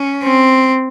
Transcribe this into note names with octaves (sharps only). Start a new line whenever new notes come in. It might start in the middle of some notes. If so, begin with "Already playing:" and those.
Already playing: C#4
C4